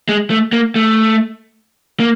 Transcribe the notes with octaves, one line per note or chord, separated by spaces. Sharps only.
G#3
A3
A#3
A3
A#3